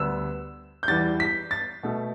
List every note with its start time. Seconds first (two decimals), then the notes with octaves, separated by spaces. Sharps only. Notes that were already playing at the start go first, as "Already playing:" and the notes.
Already playing: D2 D3 G3 B3 E6
0.83 G6
0.88 E2 E3 G3 A6
1.20 B6
1.51 A6
1.83 B2 A3